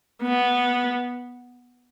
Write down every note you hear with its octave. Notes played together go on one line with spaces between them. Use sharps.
B3